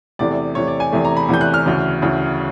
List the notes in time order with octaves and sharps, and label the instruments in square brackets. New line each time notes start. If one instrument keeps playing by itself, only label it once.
[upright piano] E2 C3 E3 A3 D5
E2 C3 E3 A3 C#5
D5
G#5
E2 C3 E3 A3
A#5
B5
E2 C3 E3 A3 G6
F#6
F6
D2 C#3 E3
D2 C#3 E3